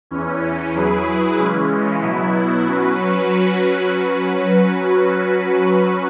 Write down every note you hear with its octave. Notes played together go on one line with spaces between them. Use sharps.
E2 E3 C#4
F#3 E4 G#4 B4
C#3 E3 G#3 C#4
B2 F#3 B3 E4
F#3 C#4 F#4 B4